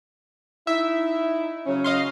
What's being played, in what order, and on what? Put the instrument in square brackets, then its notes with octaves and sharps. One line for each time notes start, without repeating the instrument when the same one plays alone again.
[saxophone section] D#4 E4 [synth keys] E5
[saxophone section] C#3 F#3 C#4
[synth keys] D#5 F5 C6